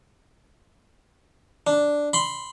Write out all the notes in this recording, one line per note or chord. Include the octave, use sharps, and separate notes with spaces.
D4
B5 C6